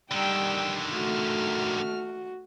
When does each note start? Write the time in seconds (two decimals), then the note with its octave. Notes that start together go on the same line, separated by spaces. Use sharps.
0.11 D3 D#3 G3 G5 E6
0.93 A3 F#4 F6